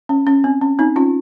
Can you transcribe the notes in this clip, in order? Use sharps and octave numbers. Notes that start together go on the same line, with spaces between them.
C#4
C#4
C4
C#4
C4 D#4
C#4 F4